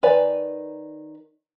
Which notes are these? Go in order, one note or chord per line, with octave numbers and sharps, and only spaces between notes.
D#3 B4 C#5 D5 G#5